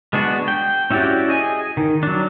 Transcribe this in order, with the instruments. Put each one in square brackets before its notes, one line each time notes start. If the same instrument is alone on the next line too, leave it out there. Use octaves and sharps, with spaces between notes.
[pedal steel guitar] G#3 B3 D4 F#4
G5
C#4 E4 F#4 G4 D5
G#4 D#5 G#5
D#3
F#3 D4